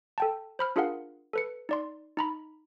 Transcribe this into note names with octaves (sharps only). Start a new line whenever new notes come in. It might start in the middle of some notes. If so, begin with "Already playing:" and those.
A4 G5 A5
C5 B5 F6
D4 F4 G#4 A#4 F5 F#5
A4 B4 C#7
D#4 D5 C6
D#4 A#5 B5